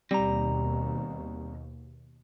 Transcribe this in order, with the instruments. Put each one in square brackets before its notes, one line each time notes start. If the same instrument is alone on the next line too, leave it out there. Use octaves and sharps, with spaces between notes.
[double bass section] D#2 B2 [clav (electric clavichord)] G3 [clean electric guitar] C4 D#4 A#5